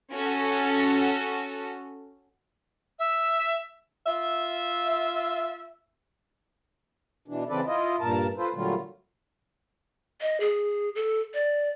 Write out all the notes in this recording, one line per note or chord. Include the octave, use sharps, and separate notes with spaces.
C#4 F#4 A4
E5
F4 E5
B2 E3 D4
C#3 E3 C4 A4 B4 D5
E4 F4 D#5
G2 A#2 A#4 A5
F4 A4 B4 C5
A#2 D3 F#3 G3 A3 F4
D#5
G#4
A4
D5